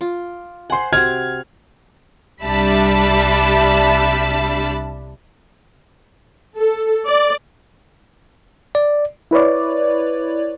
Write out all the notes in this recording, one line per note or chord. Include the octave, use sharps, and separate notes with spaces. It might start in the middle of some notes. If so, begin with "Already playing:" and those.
F4 D6
C5 F#5 G#5 C6
C3 F#4 F6 G#6
C2 G3 D4 E5 A5 B5
A4
D5
D5
E4 B4 C#5 D5